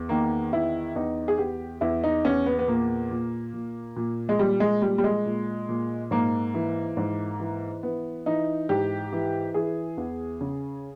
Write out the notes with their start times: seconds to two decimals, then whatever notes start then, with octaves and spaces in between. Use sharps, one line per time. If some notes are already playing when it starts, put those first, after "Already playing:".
Already playing: E2
0.09 D#3 A#3
0.52 E2 E4
0.96 E2 D#4
1.28 G#4
1.38 E2 G4
1.81 E2 E4
2.04 D#4
2.25 E2 C#4
2.46 B3
2.59 B3
2.68 A#2 A#3
3.11 A#2
3.53 A#2
3.96 A#2
4.29 G#3
4.39 A#2 G3
4.60 G#3
4.82 A#2 G3
4.98 G3
5.04 G#3
5.26 A#2
5.69 A#2
6.11 G#2 A#3
6.54 E3
6.97 G#2
7.40 E3
7.83 E3 B3
8.26 E3 D#4
8.69 G#2 G4
9.13 E3
9.54 E3 G#4
9.98 E2
10.41 C#3